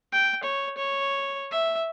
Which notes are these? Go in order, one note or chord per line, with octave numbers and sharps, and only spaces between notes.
G5
C#5
C#5
E5